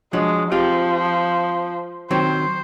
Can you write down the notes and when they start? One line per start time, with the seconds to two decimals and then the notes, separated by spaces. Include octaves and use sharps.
0.13 F3 F#3 G#3 D4
0.52 F3 C4 F4 G4
2.11 D#3 F#3 C4 C5